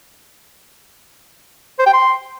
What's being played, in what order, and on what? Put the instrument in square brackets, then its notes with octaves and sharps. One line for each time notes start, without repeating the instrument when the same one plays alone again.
[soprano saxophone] C5
G5
C6